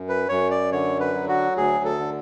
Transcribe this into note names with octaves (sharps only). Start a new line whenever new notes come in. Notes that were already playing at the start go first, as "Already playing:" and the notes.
Already playing: F#2
B4
F#2 C#5
D5
D3 C#5
B4
F#3
F#4
D2 G#4
A4
D3